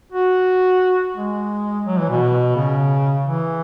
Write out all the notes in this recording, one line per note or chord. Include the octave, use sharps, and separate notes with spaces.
F#4
G#3
F#3
E3
B2
C#3
E3